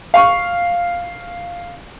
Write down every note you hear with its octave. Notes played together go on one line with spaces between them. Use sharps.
F5 C#6